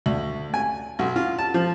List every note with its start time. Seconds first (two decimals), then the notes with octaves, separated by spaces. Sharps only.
0.06 D2
0.54 G#5
0.99 B1
1.16 F4
1.38 A5
1.54 F3